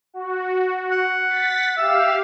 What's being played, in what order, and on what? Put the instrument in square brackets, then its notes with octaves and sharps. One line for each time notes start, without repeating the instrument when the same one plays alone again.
[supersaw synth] F#4
[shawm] F#5
[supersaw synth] A6 B6
[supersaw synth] G4 F5 [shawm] E5